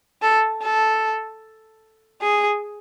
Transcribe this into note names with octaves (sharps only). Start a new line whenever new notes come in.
A4
A4
G#4